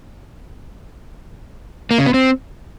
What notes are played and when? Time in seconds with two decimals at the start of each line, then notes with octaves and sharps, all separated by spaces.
1.91 A#3
1.98 C#3
2.06 B3
2.14 C4